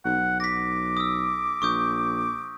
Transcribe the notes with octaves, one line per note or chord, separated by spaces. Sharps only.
B1 F#5
D6 A#6 B6
D#6 E6
A#1 C#6 D#6 G6